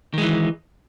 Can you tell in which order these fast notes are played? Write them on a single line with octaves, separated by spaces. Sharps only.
D#3 G#3 E3